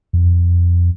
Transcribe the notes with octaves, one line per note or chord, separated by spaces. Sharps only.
F2